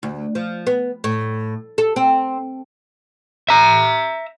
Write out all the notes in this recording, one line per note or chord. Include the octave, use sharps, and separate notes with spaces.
D2
F3
B3
A2
A4
C4
E5 A#5